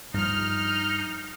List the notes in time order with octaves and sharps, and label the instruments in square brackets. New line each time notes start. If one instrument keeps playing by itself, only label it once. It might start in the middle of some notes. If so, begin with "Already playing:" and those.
[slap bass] G2 F3 [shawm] D#4 [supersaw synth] F6